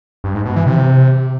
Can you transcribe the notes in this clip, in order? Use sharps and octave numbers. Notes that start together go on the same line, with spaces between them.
G2
G#2
B2
E3
C3